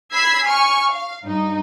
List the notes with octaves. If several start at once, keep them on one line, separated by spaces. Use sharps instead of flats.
B5 E6 G#6 B6 C7
G#5 C#6 F6
F5
G2 D#4